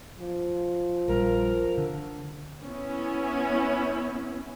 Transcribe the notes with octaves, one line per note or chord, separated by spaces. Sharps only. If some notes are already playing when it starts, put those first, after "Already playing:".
F3
A#1 G3 A#4
D3
B3 C#4 E4